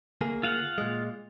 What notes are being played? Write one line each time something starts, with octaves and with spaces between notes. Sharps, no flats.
D2 A#3 G#4
F4 F5 F#5
A#2 G#3